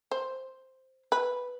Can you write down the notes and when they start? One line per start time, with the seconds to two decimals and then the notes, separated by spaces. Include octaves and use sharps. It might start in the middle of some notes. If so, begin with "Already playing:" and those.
0.11 C5
1.12 B4